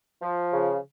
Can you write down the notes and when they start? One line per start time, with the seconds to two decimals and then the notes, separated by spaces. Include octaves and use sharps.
0.22 F3
0.52 C#3